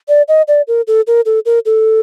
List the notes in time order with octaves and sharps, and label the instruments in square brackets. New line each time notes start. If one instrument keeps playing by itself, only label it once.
[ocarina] D5
D#5
D5
A#4
A4
A#4
A4
A#4
A4